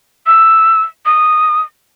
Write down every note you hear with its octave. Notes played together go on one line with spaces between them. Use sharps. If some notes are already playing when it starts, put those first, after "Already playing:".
E6
D#6